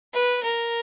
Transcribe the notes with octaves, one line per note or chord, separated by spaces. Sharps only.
B4
A#4